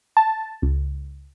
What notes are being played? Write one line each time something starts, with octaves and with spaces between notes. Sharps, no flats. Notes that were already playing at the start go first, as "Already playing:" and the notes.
A5
C#2